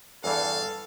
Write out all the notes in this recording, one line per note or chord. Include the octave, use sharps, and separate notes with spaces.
E2 G2 E3 A4 F5